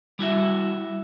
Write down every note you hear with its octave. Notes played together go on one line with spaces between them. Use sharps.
G3 E4 F#4 E5